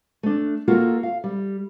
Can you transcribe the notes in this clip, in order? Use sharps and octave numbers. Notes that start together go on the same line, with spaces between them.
A3 D4
A#3 F4 F#4 A4 A#4
F5
G3